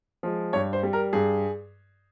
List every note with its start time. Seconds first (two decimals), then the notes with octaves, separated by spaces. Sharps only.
0.23 F3 G#3
0.53 G2 C#5
0.73 C5
0.83 G3
0.93 A#4
1.13 G2 G#4